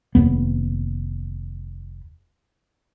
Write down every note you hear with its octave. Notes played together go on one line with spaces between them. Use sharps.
F1 D#2 B3